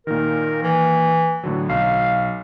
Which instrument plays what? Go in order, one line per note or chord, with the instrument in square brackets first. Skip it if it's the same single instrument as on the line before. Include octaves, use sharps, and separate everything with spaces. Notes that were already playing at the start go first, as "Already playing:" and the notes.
[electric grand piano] A#2 D#3 [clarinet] A#4
[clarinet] E3
[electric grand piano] A2 D3 F#3
[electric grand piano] B1 [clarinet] F5